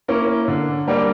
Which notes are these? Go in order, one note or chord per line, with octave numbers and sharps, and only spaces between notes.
A#3 C#4 E4
D3
G3 A#3 D4